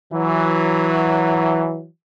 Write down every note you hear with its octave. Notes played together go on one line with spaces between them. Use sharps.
E3 F#3